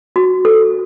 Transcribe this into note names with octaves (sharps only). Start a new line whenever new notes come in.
F#4
A4